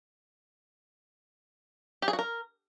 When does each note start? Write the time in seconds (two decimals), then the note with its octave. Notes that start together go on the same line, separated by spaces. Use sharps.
2.02 G4
2.08 G#4
2.13 F#4
2.19 A#4